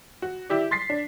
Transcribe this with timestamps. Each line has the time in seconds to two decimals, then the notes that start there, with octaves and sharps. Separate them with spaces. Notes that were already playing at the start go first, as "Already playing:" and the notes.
0.22 F#4
0.50 E4 G4 D5
0.71 C6 A6 B6 C7
0.90 D4